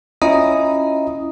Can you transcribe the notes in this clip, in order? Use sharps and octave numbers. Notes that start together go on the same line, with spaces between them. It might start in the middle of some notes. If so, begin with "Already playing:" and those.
C#4 E4 F4 D#5 A#5 D#6